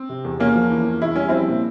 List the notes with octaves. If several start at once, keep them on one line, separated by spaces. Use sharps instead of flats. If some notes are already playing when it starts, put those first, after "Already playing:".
Already playing: C4
C3
E2
E2 A#3 C#4
F3
E3
E2
E2 E4
G3 C#4
F3 C4 E4
A#2